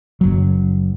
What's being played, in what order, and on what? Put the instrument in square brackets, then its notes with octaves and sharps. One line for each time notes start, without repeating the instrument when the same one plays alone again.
[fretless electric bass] F#1 F#3